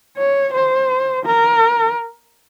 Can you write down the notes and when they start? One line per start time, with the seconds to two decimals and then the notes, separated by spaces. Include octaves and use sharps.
0.17 C#5
0.54 C5
1.25 A#4